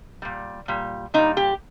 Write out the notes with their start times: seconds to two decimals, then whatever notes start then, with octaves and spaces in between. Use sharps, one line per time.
0.22 A#2 G3
0.68 A#2 G3
1.14 A#2 G3 D#4
1.37 G4